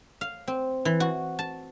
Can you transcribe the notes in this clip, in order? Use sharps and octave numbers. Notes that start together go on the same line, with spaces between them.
F5
C4
E3
F#4
A5